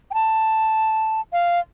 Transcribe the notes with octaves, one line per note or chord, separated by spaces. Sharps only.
G5
A5
F5